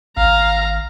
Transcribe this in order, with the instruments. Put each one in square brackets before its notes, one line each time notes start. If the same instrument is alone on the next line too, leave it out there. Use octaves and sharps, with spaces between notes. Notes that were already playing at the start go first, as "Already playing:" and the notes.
[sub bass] G#1 [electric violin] F5 [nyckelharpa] A#5